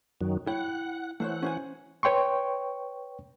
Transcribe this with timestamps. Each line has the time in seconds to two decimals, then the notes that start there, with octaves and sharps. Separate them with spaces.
0.21 F#2 D#3 F#3
0.47 E4 C#5 F#5 G5
1.20 E3 A3 C5 C#5 F#5
1.42 C#4 C5 G#5
2.03 B4 C#5 G5 C6 C#6